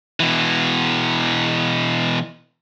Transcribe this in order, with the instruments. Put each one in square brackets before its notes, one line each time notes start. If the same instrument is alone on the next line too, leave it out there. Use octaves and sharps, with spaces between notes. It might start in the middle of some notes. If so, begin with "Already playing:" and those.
[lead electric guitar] B2 E3